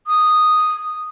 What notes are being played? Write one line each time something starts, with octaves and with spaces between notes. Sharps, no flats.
D#6